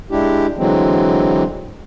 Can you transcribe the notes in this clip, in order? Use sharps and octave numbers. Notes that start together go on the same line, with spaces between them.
G#3 D4 E4 G4
D3 E3 F#3 G#3 C4